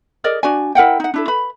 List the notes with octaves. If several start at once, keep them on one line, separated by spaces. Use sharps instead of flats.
G#4 A#4 D5 D#5
D4 F#4 D5 G#5
E4 A#4 F#5 G5
D#4 F#5
D4 E4 A4
B4 B5